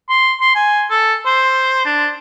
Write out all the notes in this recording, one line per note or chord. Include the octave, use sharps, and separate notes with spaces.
C6
C6
G#5
A4
C5
D4